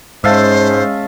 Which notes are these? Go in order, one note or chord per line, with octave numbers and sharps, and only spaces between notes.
G#2 G#3 C#4 C5 E5 F5 A5